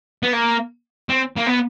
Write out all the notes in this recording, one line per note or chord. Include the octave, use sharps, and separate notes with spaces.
B3
A#3
C4
A#3
B3